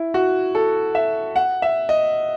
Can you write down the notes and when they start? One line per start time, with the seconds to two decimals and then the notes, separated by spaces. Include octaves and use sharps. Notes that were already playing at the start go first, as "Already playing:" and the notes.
Already playing: E4
0.14 F#4
0.55 A4
0.95 E5
1.36 F#5
1.62 E5
1.89 D#5